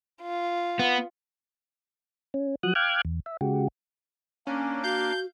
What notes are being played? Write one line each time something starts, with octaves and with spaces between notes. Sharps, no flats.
F4
B3
C#4
F3 F#3 F#4 D#6 F#6
F5 G5 D6 F6 F#6 G#6
E2
E5
C#3 G#3 F#4 G4
A#3 C#4 D4
F#4 F5 G6